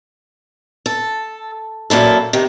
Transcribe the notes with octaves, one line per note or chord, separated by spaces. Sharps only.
A4
F#2 A#2 E4 A4
C3 D#3